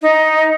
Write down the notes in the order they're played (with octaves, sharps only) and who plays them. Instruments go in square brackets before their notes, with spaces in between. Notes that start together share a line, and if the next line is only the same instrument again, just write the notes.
[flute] D#4